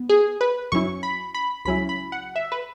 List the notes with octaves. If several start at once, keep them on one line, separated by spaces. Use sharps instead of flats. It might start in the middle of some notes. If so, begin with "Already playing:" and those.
Already playing: B3
G#4
B4
F#2 F#3 C#4 E4 C#6
B5
B5
C#2 C#3 F#3 C#4 E4 B5
B5
F#5
E5
B4